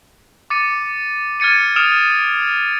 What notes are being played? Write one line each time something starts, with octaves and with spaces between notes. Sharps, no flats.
D6 A6 C#7 D#7
F6 G#6 A6 C#7 D#7
D#6 F6 D7 E7 F7